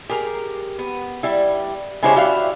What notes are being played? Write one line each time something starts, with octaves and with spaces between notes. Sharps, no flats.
G4 G#4 A#4 A#5
B3
G3 E4
C#3 G#3 E4 G4 C5 C#5
E4 F#4 G4 D5 E5 F5